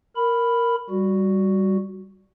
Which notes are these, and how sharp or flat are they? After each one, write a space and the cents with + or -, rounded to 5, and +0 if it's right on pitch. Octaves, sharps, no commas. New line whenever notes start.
A#4 +0 B5 +0
G3 -5 F#4 +0